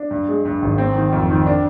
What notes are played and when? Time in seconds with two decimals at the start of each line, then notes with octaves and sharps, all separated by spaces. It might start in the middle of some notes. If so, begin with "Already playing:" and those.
Already playing: D4
0.11 G2
0.29 G#3
0.45 G2
0.62 G#1
0.78 C4
0.95 D#3
1.12 F2
1.30 D#3
1.46 D4